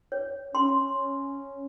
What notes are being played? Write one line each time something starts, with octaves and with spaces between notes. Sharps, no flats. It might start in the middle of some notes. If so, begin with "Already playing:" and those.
C#5
C#4 C6